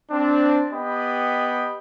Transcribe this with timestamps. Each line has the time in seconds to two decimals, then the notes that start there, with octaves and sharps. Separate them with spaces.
0.11 C4 D4
0.72 B3 G4 D#5 G5 B5